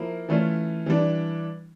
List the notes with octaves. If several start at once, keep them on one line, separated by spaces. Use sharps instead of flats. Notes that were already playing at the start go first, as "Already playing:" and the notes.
Already playing: F3 A#3 E4
E3 A3 C#4 F4
E3 G3 D4